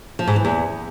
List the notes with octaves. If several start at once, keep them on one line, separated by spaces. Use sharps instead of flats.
F3
G#2
E3
E2